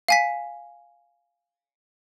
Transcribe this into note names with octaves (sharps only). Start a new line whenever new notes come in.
F5 G#5 B6